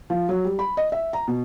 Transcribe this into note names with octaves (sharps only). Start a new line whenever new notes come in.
F3
F#3
G3
B5
D#5
E5
A#5
B2